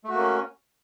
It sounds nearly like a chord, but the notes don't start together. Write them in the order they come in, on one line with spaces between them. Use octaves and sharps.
A3 F#4 A#3 C#4